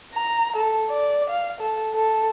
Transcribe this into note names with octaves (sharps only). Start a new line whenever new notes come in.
A#5
A4
D5
F5
A4
A4